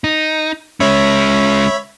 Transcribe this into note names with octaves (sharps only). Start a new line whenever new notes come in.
D#4
G#3 C#4 C#5 E5 B5